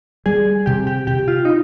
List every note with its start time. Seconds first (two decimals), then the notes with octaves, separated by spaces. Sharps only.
0.26 G3 G#4
0.66 C3 G4
0.87 G4
1.07 C3 G4
1.28 F4
1.45 D#4